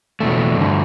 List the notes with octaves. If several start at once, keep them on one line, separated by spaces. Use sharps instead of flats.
E2 B2 A3
G2 D3